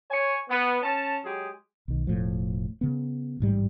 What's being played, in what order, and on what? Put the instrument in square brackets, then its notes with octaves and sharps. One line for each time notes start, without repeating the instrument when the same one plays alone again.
[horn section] C#5 G#5
B3
C#4 A5
F#3 G#3 G4 G#4
[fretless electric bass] B1 D#3
E1 A2 F3
C#3 B3
A1 G#2 G3